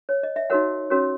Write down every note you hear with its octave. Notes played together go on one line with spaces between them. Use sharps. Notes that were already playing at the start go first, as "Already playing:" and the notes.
C#5
D#5
E5
D#4 F#4 A#4 C#5 F#5
C#4 F#4 A#4 C#5